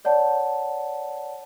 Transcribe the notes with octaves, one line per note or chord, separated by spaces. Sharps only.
C#5 D5 F#5 A5